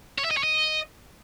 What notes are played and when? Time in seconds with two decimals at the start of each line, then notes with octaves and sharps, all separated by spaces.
0.18 C#5
0.25 E5
0.31 D#5
0.37 C#5
0.43 D#5